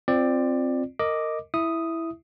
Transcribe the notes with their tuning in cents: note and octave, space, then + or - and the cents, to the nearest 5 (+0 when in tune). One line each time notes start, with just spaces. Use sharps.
C4 +0 F4 -5 D5 +15
A#4 -20 D#5 +0 D6 +0
E4 +0 E5 +0 D#6 +0